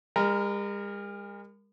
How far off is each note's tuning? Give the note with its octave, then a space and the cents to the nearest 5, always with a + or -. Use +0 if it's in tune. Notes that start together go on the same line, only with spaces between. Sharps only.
G#3 -45 A#4 +0